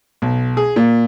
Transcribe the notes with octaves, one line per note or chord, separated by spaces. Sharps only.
B1
G#4
A#2